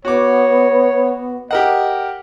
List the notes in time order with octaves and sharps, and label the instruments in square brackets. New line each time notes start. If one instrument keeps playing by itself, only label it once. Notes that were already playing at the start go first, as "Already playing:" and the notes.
[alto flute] B3 [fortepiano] F#4 D6 [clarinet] C#5
[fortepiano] G4 A#4 F#5 [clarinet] D#5